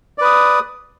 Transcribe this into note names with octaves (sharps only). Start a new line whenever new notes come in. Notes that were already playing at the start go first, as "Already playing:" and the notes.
B4 D5 D#6